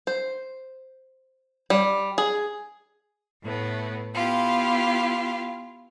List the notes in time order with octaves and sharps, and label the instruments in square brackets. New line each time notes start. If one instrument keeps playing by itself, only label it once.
[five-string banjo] C5
G3
G#4
[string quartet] A2 A3 B3
B3 E4 F4 G4